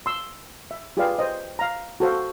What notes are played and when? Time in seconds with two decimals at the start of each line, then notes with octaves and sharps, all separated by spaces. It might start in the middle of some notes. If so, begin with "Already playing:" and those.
0.06 C6 E6
0.71 E5
0.97 F4 G4 G#4 B4 D5 F5
1.19 C5 D#5
1.59 F5 A#5
2.00 F#4 A4 C5 F5